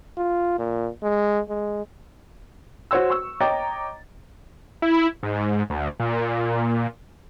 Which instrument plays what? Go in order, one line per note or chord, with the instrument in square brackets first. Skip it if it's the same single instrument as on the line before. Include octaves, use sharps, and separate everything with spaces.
[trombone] F4
A#2
G#3
G#3
[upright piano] F#4 C5 C#5 C6 E6
C#6 E6
C#5 D#5 G5 A#5 D6 A6
[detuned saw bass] E4
G#2
D2
A#2